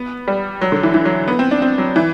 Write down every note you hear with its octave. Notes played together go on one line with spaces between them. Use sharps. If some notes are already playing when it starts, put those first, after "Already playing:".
Already playing: B3
G3
F#3
D3
E3
E3
F#3
B3
C4
D4
C4
F#3
E3